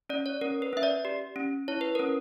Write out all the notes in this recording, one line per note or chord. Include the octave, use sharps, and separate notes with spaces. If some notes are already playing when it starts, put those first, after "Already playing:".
C#4 D5
C#5
C#4 A#4
B4
C#4 E5
D5
G4
C#4
E4 C#5
B4
C#4 A#4